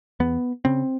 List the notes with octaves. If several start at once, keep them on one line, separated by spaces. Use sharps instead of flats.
E2 B3
C#3 C4